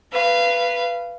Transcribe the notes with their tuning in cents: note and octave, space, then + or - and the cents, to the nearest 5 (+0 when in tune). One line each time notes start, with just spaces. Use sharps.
B4 +0 F5 -25